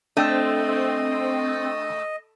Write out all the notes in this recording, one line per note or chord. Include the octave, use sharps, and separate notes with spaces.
A3 C4 D4 D#5 G5 E6